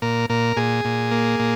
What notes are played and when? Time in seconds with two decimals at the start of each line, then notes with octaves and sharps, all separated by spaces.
0.02 A#2 A#4
0.29 A#2 A#4
0.57 A#2 G#4
0.85 A#2
1.11 A#3
1.40 A#2